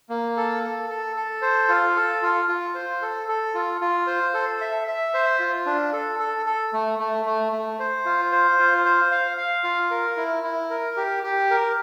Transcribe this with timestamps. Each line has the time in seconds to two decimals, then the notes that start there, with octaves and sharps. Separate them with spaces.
0.10 A#3
0.37 A4
0.63 A4
0.90 A4
1.16 A4
1.42 C5
1.69 F4
1.96 A4
2.22 F4
2.48 F4
2.75 C5
3.02 A4
3.29 A4
3.55 F4
3.81 F4
4.07 C5
4.34 A4
4.61 E5
4.87 E5
5.14 C5
5.40 F4
5.66 D4
5.93 A4
6.19 A4
6.46 A4
6.73 A3
6.99 A3
7.26 A3
7.52 A3
7.79 C5
8.05 F4
8.32 C5
8.59 F4
8.85 C5
9.12 F5
9.37 F5
9.64 F4
9.91 A#4
10.17 E4
10.43 E4
10.70 A#4
10.97 G4
11.23 G4
11.50 A#4